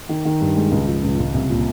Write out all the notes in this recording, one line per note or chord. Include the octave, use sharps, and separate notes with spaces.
D#3
D#3
G2
G#3
C#2
F3
C#2
C#2
C2
A#2